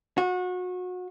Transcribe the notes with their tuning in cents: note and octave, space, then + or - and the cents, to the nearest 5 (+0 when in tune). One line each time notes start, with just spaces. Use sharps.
F#4 -30